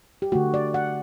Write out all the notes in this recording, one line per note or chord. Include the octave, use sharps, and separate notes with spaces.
G4
D3 A3 F#4
D5
F#5